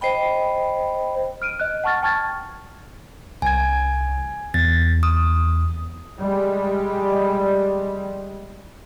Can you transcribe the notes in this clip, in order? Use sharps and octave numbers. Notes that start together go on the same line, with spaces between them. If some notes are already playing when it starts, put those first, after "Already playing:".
C5 D#5 G5 B5
F6 D7 D#7
D#5 F#6
F#5 A5 C#6 F6 A6
G5 A5 C#6 F6 G#6 A6
C2 G#5 G#6
E2 A6
D#6
G3 G#3